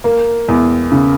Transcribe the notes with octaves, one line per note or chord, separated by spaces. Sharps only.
A#3
E2
C#3